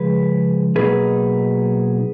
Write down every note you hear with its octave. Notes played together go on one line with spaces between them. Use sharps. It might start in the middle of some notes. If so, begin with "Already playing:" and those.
Already playing: C#3 F3 G#3 G#4 B4
B2 F#3 A#3 D#4 G#4 B4